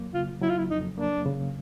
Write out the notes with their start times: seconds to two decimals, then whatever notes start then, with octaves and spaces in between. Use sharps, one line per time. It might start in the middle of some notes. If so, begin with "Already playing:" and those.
Already playing: F2 F#3 A#3
0.13 C#3 F4
0.41 F#3 E4
0.50 F4
0.58 E4
0.70 F2 D#4
0.98 A#3 D4
1.26 C#3